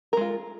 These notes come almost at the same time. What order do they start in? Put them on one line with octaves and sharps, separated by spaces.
A#4 G#3 F4